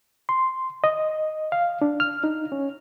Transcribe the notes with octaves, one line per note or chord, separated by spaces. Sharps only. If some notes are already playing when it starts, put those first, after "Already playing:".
C6
D#5
F5
D4
F6
D#4
C#4